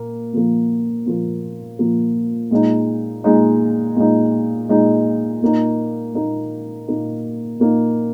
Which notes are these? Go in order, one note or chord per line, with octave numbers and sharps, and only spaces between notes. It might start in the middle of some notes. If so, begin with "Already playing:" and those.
Already playing: A#2 A#3
A#2 F3 A#3
A#2 F3 A#3
A#2 F3 A#3
A#2 G#3 D#4
A#2 G#3 D#4
A#2 G#3 D#4
A#2 G#3 D#4
A#2 A#3 D#4
A#2 A#3 D#4
A#2 A#3 D#4
A#2 A#3 D#4